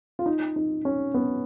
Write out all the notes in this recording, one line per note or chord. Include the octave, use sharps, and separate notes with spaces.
F4
D#4
D#4
C#4
B3